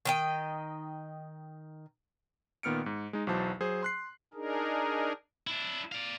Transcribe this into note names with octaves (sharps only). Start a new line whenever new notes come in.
D#3 D#5 G5
A#2 D#3 B3 F6 C#7 D7
G#2
G#3 D#4
B1 E2 F#3 E4 C5 A5
F#3 G#4 C5
C6 F#6 C7
D4 D#4 G#4 A#4
D4 E4
D5 F5